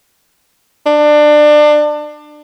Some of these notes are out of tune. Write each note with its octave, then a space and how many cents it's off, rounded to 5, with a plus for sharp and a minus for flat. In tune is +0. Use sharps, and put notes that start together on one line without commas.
D4 +25